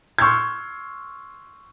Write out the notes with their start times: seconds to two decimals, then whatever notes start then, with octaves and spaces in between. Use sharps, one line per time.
0.18 C6 C#6 E6 F6 G6 G#6